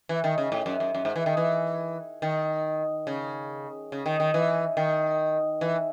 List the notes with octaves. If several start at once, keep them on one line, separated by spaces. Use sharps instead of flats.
E3
D#3
C#3
A2
F#2
F#2
F#2
G#2
E3
D#3
E3
D#3
C#3
C#3
D#3
D#3
E3
D#3
E3